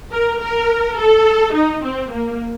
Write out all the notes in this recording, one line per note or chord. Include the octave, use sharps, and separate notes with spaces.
A#4
A#4
A4
D#4
C4
A#3